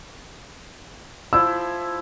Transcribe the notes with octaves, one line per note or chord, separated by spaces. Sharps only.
F3 E4 E6